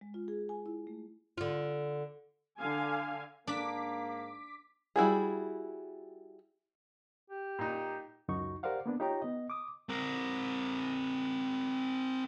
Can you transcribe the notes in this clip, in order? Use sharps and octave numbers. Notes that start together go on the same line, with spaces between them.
G#3
F4
G#4
G#5
E4
A3
D3 F4
D3 F5 G#5
G#2 A#3 D4 D6 B6
G3 E4 F#4 G#4
G4
A#2 D#4
C#2 F#2 D#4 F#4 C#6
G4 A#4 C5 D5 F5 F#5
A#3 B3 D4
D#4 F4 G4 C#5 G5 A#5
B3 D#5
D6 D#6
C4 A#4